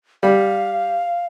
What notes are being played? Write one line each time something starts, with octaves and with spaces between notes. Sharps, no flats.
G3 F5